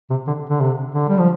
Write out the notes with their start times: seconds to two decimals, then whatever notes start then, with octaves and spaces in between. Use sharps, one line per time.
0.10 C3
0.27 D3
0.50 D3
0.61 C3
0.95 D3
1.09 G3
1.19 F3